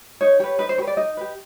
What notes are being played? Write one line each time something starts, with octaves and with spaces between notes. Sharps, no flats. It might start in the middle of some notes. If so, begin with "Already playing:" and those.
D#4 C#5
G4 B4 C#5
D#4 B4
C5
G4 B4 C#5
D5
D#4 D#5
G4 B4